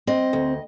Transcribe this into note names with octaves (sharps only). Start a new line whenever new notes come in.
C4 D#5
D2